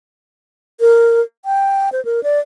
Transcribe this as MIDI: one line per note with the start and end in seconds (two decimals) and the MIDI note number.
0.81 1.21 70
1.45 1.89 79
1.92 2.03 72
2.05 2.23 70
2.23 2.40 74